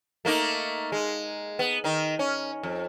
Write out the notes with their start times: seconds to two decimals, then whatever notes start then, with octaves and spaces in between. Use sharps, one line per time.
0.25 A3 A#3 D#4
0.92 G#3
1.59 B3
1.84 D#3 D#4
2.19 C#4
2.63 F2